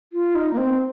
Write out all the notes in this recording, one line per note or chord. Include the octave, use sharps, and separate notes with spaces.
F4
D#4
A#3
C4